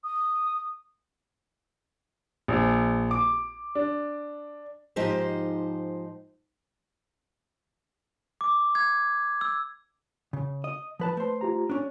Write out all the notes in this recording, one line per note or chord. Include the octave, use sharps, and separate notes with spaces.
D#6
A#1
D6
D4
G#2 F3 D#4 G4 C5
D6
G#6
E6
C#3
D#5 D#6
F3 B4 A5
A3 B4 C5
F4 G4 A#5
C#4 D4